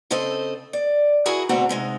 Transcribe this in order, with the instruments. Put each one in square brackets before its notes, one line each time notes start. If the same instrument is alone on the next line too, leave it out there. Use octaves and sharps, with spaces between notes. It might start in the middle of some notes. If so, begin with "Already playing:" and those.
[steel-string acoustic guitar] C#3 C4 A4 C5 D#5
D5
E4 F#4 G#4 A#4
D2 B2 C4 F#4 F#5 A#5
C3 G#3 D#4